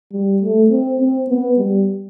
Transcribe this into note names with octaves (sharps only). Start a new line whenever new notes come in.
G3
A3
C4
C4
B3
G3